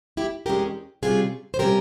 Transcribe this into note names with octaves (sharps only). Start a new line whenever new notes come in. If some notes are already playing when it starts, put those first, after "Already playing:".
E4 G4
E2 C3 E3 G#3 C#4 G4 A#4
C3 G3 C#4 F4 G#4
C5
C3 G3 C#4 G4 A#4